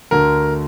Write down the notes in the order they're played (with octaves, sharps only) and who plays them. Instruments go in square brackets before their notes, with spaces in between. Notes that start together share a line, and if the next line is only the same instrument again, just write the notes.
[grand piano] D2 D3 A3 A#4